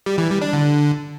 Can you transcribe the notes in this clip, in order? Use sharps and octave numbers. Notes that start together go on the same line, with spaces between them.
G3
E3
G3
D4
D3